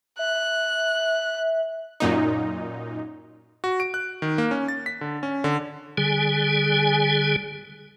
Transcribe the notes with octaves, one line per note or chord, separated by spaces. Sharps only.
E5 F#6
F#2 A#2 D#4
F#4
D7
F#6
D#3
A#3
C#4
A6
B6
D3
C#4
D3
D3 G3 G#4 G#5